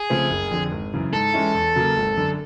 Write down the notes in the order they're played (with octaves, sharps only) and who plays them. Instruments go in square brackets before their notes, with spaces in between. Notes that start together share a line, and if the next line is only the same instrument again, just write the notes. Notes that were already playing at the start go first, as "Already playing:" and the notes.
Already playing: [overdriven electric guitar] G#4
[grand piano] C#3 F3 A3 C4
F#1
F2 D3
G#1
F#2 C#3 E3
[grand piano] G#2 [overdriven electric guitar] A4
[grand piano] E3 G#3 C#4 E4
E2
C#3 F#3 A#3
G#1
F#2 D3